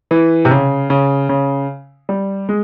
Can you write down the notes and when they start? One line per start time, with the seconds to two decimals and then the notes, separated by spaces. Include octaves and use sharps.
0.11 E3
0.45 C3
0.51 C#3
0.90 C#3
1.29 C#3
2.09 G3
2.49 G#3